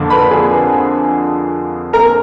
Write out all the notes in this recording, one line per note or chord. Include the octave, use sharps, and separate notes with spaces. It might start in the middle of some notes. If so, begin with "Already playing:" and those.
Already playing: F2 D3 F3 A#3 D4
B4 B5
G#4 G#5
A#4 A#5